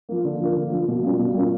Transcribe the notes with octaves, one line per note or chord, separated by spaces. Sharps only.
F3 A#3
D3
F3 A#3
D3
F3 A#3
B2
G3 A#3 C#4 F4
B2
G3 A#3 C#4 F4